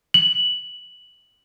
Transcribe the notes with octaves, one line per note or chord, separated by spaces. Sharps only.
F#7